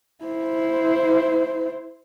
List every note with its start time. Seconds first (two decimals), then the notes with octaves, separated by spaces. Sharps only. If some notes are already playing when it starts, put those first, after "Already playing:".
0.25 E4 C5